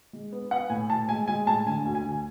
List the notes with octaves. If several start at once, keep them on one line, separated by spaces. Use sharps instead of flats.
G#3
B3
B3 F#5
A2 G#5
A2 A5
G#3 G#5
G#3 G#5
A2 A5
D3 G#5
D2
G#5
D2